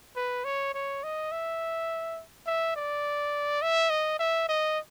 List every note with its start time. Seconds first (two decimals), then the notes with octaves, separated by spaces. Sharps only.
0.16 B4
0.45 C#5
0.74 C#5
1.03 D#5
1.32 E5
2.46 E5
2.76 D5
3.62 E5
3.90 D#5
4.19 E5
4.49 D#5